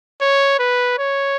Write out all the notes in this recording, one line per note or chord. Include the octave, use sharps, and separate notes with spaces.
C#5
B4
C#5